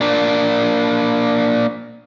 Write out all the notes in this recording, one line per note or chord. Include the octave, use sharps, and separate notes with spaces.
A#3 D4